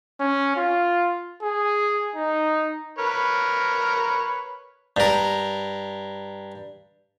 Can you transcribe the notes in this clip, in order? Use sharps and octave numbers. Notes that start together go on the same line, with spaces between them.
C#4
F4
G#4
D#4
A#4 B4 C#5
G2 A#4